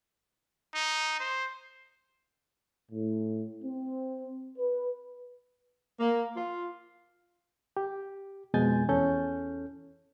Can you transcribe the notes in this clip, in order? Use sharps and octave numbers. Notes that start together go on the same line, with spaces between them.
D#4
C5
A2
C4
B4
A#3
F4
G4
F2 B2 G#3 G#5 G6 A6
E2 C#4 A4 G6